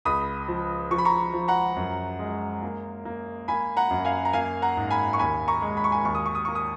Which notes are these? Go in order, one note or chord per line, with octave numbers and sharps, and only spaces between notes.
C#2 B5 D#6
F3
F3 C#6
B5
A#5 C#6
F3
F#5 A#5
F#2
G#3
A#3
A#3
A#3 G#5 B5
F#5 A#5
F#2
F5 G#5
A#5
A#3 F5 G#5
F#5 A#5
G#2
G#5 B5
C#6
D#2 G#5 B5
A#5 C#6
G#3
B5
C#6
G#5 B5
D#2 C#6
D#6
C#6
D#6
A#3 C#6
D#6